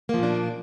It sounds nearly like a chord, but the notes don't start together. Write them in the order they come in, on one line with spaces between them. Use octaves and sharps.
A#3 F3 A#2 D4